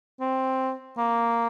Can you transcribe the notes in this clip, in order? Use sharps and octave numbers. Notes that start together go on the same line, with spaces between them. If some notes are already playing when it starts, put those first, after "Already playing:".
C4
A#3